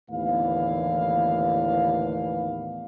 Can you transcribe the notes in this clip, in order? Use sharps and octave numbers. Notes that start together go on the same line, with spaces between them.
D#2 A2 D3 E3 B3 F5